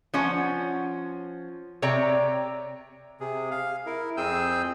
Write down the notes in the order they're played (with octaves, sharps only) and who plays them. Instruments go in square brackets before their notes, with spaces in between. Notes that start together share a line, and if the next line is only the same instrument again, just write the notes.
[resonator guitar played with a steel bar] F3 C#4 F#5
C3 C#5 D5 G5 A#5
[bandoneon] C3 G#4
F5
E4 A#4
F2 C4 G#4 G#5 E6 G6